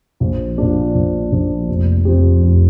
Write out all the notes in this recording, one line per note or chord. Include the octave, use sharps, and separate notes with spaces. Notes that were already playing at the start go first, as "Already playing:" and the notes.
A#1
A#2 F3 D4
A#1
A#2 F3 D4
F1
F2 F3 C4 G4
F1